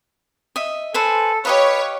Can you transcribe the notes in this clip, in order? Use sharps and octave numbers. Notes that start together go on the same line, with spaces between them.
D#5 E5
A4 B4 C5 G#5
G4 B4 C#5 D#5 F5